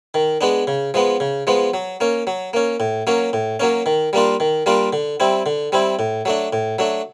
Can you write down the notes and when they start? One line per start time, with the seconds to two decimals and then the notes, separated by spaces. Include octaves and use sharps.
0.14 D#3
0.41 G#3 B3 D4
0.67 C#3
0.94 F3 G#3 B3
1.20 C#3
1.47 F3 G#3 B3
1.74 F#3
2.01 A#3 C#4
2.27 F#3
2.53 A#3 C#4
2.80 A2
3.07 F#3 A#3 C#4
3.33 A2
3.60 F#3 A#3 C#4
3.86 D#3
4.13 G3 A#3 D4 F4
4.40 D#3
4.66 G3 A#3 D4 F4
4.93 D3
5.20 G3 C4 E4
5.46 D3
5.72 G3 C4 E4
5.99 A2
6.25 F#3 A3 D4
6.53 A2
6.79 F#3 A3 D4